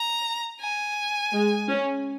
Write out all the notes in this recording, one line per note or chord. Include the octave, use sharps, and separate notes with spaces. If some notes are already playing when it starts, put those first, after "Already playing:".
Already playing: A#5
G#5
G#3
C#4